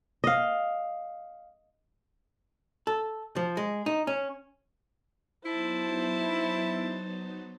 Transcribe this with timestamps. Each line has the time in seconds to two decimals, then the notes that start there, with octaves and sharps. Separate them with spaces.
0.24 D#5 F5
2.87 A4
3.36 F3
3.57 G#3
3.86 D#4
4.07 C#4
5.45 F#3 B3 D#4 E4 C5 A5